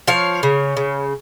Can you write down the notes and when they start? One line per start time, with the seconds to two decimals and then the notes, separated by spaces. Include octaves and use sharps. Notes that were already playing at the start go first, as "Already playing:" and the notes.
0.08 F3 C#5 F5
0.43 C#3
0.77 C#3